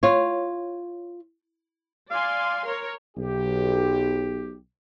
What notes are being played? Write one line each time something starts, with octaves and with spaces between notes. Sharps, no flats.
F4 C#5
D5 F5 G#5 C6
A#4 C#5
B1 G4